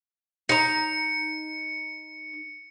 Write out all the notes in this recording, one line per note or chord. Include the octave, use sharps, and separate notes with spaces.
D#4 A#5 C#7